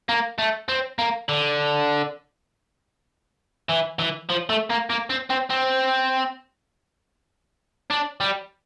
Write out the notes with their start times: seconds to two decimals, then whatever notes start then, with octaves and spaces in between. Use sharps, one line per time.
0.09 A#3
0.38 A3
0.68 C4
0.99 A#3
1.29 D3
3.70 E3
3.99 E3
4.30 F3
4.50 A3
4.70 A#3
4.90 A#3
5.10 C4
5.30 C4
5.50 C4
7.91 D4
8.20 G3